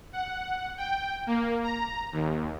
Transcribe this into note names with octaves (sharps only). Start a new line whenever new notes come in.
F#5
G5
A#3
A#5
D#2